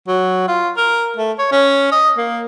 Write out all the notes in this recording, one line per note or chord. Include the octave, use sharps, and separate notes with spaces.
F#3
F4
A#4
A3
C#5
C#4
D#5
A#3